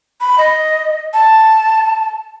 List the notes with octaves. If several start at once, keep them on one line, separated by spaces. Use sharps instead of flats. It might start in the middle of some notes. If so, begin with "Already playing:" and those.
B5
D#5
A5